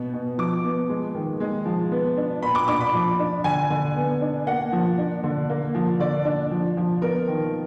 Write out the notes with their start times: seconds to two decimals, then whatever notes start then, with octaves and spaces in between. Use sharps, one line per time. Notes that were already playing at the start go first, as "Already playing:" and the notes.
Already playing: B2 B3
0.13 B2
0.38 F3 D6
0.64 B3
0.89 G#3
1.15 D#3
1.40 G#3
1.66 F3
1.92 B3
2.17 D4
2.43 A#2 B5
2.55 D6
2.68 D4 D6
2.81 B5
2.94 F3
3.19 D4
3.44 D3 G#5
3.70 D3
3.96 B3
4.21 D4
4.47 A#3 F#5
4.72 F3
4.98 D4
5.24 D3
5.49 A#3
5.75 F3
5.99 D3 D5
6.25 D4
6.51 F3
6.77 F3
7.01 B3 A#4
7.28 D#3